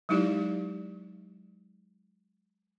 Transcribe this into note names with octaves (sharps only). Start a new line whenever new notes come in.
F#3 G#3 D#4 E4 G4 D5